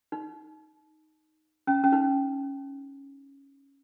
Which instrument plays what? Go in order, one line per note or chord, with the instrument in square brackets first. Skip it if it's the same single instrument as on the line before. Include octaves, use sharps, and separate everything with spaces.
[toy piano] D#4
C#4
C#4
D#4